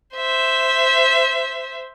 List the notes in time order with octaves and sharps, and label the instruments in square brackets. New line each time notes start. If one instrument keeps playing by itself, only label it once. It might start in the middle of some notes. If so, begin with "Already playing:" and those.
[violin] C5 E5